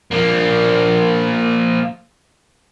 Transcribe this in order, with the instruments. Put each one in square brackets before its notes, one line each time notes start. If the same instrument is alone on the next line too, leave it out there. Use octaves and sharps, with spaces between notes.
[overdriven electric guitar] F3 A#3